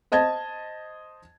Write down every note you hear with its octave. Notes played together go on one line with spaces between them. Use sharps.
C5 D#5 A5 G#6